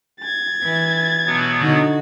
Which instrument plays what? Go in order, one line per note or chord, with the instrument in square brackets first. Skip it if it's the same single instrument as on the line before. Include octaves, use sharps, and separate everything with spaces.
[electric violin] G#6 A6
[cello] E3
[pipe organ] B2 F#3 B3
[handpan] D3 D#4 [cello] F#4